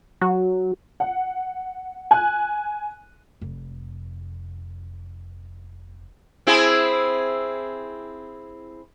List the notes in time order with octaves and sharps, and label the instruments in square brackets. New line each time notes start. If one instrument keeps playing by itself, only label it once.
[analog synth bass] F#3 [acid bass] F#4
[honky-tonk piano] F#5
G#5 F#6
[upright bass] F1 F2
[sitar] C4 E4 G#4